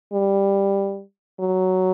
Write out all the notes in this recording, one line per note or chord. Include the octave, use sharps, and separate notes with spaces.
G3
F#3